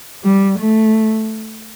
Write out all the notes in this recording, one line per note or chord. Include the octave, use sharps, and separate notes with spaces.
G3
A3